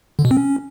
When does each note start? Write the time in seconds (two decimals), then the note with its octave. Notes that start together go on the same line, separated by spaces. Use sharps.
0.19 D3
0.25 B2
0.31 C4
0.37 C#4